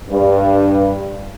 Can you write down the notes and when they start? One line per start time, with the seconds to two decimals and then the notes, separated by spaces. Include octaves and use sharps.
0.10 G2